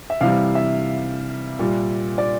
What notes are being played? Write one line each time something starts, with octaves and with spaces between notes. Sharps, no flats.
E5
C3 E3 G3 F5
E5
A#2 G3
D5